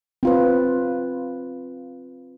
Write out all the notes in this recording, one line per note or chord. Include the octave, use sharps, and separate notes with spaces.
C4 F4 B4